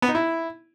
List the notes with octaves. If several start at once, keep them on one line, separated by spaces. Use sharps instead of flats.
B3
D#4
E4